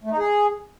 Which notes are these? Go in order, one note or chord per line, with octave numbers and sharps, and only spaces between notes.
A3
D#4
G#4